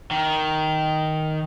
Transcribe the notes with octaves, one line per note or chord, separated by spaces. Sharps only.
D#3